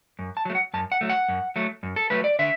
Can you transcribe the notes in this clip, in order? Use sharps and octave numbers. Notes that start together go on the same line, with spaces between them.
F#2
A5
F#3 A3
F#5
F#2 A5
F#5
F#3 A3
F#5
F#2
F#3 A3
F#2
A4
F#3 A3 B4
D5
D3 E5